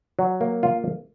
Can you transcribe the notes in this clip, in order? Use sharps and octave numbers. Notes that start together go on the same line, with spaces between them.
F#3
A#3
F4